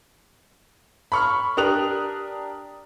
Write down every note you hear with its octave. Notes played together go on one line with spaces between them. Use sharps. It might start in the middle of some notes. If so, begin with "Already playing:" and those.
B5 C#6 F6
D4 G4 A#4 D#6 F#6 F7